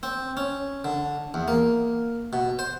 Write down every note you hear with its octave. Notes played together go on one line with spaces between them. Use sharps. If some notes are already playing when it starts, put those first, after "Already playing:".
C4
C#4
D3
E2
A#3
B2
C5